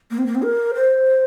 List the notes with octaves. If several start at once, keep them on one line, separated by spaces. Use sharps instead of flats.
A#3
C4
A#3
C4
A#4
C5